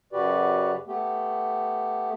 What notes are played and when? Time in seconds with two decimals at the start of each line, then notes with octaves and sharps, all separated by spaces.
0.13 F#2 C#3 F#4 G4 B4 D5
0.87 A3 B3 G4